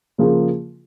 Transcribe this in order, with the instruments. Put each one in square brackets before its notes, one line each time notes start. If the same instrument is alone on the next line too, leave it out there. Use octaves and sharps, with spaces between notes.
[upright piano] C#3 F3 A#3 F4 G#4